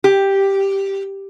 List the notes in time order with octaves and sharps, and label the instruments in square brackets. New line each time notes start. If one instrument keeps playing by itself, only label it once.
[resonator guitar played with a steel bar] G4